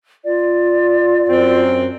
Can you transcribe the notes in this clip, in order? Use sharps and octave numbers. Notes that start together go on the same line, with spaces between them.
F4 D5
F#2 C4